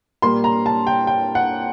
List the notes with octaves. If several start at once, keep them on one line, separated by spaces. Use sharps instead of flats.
A#2 G3 A#3 C6
A#5
A5
G5
G5
F#5